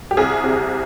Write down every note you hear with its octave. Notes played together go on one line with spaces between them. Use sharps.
G4
C2 G#4
C3